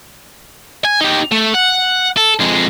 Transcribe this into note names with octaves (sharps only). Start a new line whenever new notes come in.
G#5
D#4 G4
A3
F#5
A4
F2 G#3